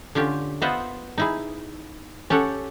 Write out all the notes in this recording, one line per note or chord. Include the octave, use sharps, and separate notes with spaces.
D3 C#4 F4 G4
B3 F4 C5 D#5 E5 F#5
D#4 E4 G#4
C#4 G4 A4 F#5